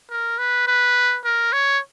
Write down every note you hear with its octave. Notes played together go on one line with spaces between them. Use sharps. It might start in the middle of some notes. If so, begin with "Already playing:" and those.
A#4
B4
B4
A#4
C#5